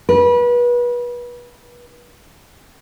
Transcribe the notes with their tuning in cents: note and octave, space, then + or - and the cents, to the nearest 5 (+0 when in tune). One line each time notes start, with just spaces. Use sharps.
B4 -30